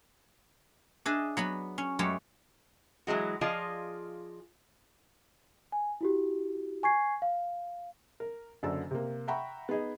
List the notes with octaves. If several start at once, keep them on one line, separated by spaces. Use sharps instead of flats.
D4 G#4 D#5 E5
F#3 B3 B5
C#4
F#2 G#3 A3 G4 C#5
E3 F#3 G#3 F#4
F3 F4 G#4 D5 D#5
G#5
E4 F#4 G4
G#5 C#6 G#6 C7
F5
A#4
F#1 F#2 D3 D5 E6
C3 A#3
E5 F#5 G5 A#5 B5 C#6
B3 D#4 G#4 D#5